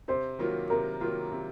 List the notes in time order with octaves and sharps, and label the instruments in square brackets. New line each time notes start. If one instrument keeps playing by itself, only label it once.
[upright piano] C3 [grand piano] C5
[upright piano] D#3 F#3 A#3 F4
[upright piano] C3 [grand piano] A#4
[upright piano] D#3 F#3 A#3 F4
C3